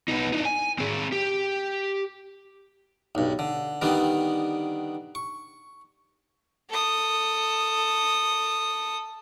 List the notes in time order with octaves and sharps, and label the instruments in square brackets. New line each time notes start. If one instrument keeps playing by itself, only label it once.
[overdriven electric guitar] B3 D#4
D4 D#4
G#5
C4 G#4
G4
[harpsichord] B1 G2
D3
D3 D#3 G3 B3
C#6
[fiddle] A4 D#6